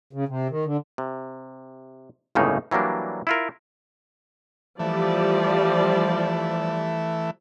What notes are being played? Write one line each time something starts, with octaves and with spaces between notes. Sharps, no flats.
C#3
C3
D#3
D3
C3
G1 C#2 A2 C#3 A#3 D#4
E3 F#3 G3 A#3 D4
E4 F4 A#4
E3 F3 G3 A3 D5